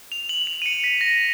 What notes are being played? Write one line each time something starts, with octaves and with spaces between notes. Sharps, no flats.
F7
F#7
F7
D#7
C#7
B6
A#6